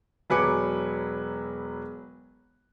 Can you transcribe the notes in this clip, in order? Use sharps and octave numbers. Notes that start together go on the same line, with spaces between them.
E1 F#3 B4 G#5 D6 C#7